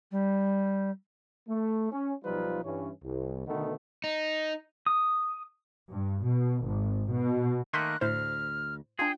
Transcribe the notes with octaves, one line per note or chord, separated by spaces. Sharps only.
G3
A3
C#4
B1 F3 G3 D#4 F4 B4
G2 E3 C#4
C2
B2 D3 D#3 A3 B3
D#4
D#6
G2
B2
G#1
B2
D#3 A3 A#3 C6 F#6 G6 B6
D2 A2 E4 C5 F6
D4 F4 G#4 G5